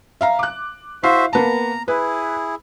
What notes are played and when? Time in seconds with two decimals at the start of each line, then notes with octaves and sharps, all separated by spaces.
0.21 E5 F5 A#5
0.39 D6 F#6
1.03 E4 F#4 C5 E5 F5 C7
1.33 A#3 B3 A5 A#5
1.88 E4 G#4 B4